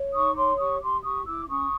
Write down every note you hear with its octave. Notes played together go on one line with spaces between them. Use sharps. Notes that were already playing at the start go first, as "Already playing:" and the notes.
Already playing: C#5
D#4 C#6 D#6
C#5 C6 D6
G4 C#6 D#6
G4 C6 D6
G4 C#6 D#6
E4 D6 E6
C#4 C#6 D#6